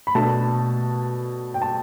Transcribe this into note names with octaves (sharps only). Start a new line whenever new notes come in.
B5
B2 A3 D4 A5
G5
A5